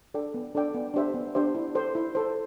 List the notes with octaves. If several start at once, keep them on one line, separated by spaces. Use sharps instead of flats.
D4 A4 D5 G5
B3
D4 A4 D5 G5
B3
D4 G4 C5 E5
B3
D4 G4 C5 E5
E4
A4 C5
E4
A4 C5